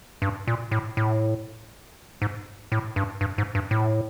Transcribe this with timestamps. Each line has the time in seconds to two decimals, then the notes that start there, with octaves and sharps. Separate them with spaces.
0.22 G2
0.47 A#2
0.71 A2
0.97 A2
2.22 G#2
2.72 A2
2.96 G2
3.21 G2
3.38 G#2
3.55 G2
3.71 A2